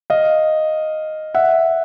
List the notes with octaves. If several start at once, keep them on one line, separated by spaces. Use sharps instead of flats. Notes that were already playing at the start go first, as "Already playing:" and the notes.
D#5 F5
E5 F#5